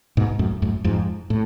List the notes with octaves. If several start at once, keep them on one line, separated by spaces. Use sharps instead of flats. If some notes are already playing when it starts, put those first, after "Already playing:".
G#2 B2
F#2 A2
F#2 A2
F2 G#2
A2